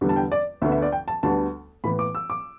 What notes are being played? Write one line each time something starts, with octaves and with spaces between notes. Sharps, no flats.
E2 D3 G3 B3
A5
G5
D5
D2 D3 B3 E5
E5
D5
G5
A5
D2 D3 G3 B3 A5
A2 E3 B3 B5
D6
E6
D6